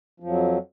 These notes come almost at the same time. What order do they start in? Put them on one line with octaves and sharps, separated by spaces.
F3 F2 F#3